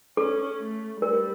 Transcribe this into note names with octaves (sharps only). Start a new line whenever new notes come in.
C#4 A4
A3
G3 A#4